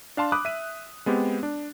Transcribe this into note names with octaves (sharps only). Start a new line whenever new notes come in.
D4 F5 A5 C6
B5 D6 D#6 F#6
E5 D#7
G#3 B3 C4 G4
D4